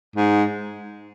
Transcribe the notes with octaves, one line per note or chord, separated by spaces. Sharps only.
G#2